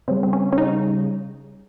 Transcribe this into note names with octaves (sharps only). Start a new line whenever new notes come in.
C#3 G3 C4
C4
C#4
C#4
D#4